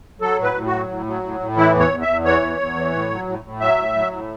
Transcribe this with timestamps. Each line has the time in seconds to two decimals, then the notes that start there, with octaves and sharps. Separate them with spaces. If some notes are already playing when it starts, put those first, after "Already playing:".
0.20 F#3 A4
0.38 A2 B4
0.54 A2
0.66 F#4
0.72 F#3
0.89 A2
1.06 F#3
1.23 A2
1.40 A2
1.56 E3 E4
1.73 E2
1.80 C#5
1.91 E2
2.02 E5
2.07 E2
2.24 E3 C#5
2.42 E2
2.58 E2
2.76 E3
2.92 A2
3.10 F#3
3.27 A2
3.44 A2
3.60 F#3 E5
3.77 A2
3.95 F#3
4.12 A2